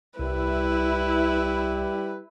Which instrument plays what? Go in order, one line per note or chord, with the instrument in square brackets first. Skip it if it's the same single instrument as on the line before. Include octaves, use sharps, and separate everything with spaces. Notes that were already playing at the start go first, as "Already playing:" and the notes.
[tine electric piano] C2 [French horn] G3 [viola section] E4 [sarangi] B4